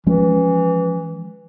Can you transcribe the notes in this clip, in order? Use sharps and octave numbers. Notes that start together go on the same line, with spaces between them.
E3 F3 G#3 C#4